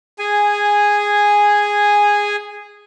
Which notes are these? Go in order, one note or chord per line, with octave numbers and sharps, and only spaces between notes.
G#4 G#5